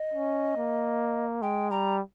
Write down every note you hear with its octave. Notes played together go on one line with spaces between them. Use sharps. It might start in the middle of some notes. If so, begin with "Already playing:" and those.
Already playing: D#5
C#4
A#3
G#3 G5
G3 A#5